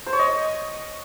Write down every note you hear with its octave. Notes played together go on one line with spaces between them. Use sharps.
C5
C#5
D#5